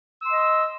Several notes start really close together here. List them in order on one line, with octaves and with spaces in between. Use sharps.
E6 C6 D#5